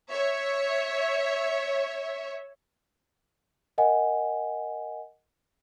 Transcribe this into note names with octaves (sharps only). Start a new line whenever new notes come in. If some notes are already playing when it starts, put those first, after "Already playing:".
C#5 E5
A#4 D#5 F#5 G#5